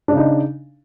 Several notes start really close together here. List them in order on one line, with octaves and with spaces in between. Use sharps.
D4 C#3 D#4